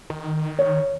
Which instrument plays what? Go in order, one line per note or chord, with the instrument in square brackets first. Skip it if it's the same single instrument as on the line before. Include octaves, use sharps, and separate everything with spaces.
[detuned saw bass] D#3
[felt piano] C#5